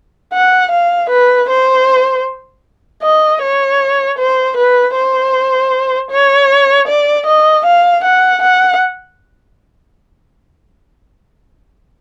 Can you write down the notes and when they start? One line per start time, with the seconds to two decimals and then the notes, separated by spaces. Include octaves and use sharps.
0.33 F#5
0.71 F5
1.10 B4
1.49 C5
3.02 D#5
3.42 C#5
4.18 C5
4.57 B4
4.95 C5
6.11 C#5
6.88 D5
7.26 D#5
7.65 F5
8.04 F#5
8.42 F#5